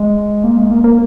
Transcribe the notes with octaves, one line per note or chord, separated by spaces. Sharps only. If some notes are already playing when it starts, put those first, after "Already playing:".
Already playing: G#3
A#3
G#3
A#3
A#3